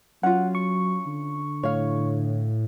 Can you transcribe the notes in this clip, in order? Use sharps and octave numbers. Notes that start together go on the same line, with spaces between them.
F#3 C#4 F4 F#5
C#6
D3
A2 C#5 F5